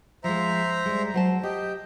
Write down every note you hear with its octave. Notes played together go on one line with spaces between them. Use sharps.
F3 G#3 C5 E5 A#5
G3 G#3
F#3 C5 A5
G4 D#5 G5